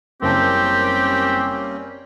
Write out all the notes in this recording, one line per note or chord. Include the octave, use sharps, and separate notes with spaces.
F#1 G3 A#3 C4 C#4 G4 A5